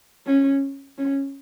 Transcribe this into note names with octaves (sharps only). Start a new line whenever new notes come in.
C#4
C#4